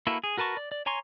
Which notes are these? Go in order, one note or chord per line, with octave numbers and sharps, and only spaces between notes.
A#3 E4 F#4 A4 B4
G#4
F#4 A#4 B4 A5 C#6
D5
D5
C#5 G#5 A#5 C6 C#6